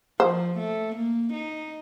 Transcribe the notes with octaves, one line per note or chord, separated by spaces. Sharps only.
F3 C5
A3
A#3
D#4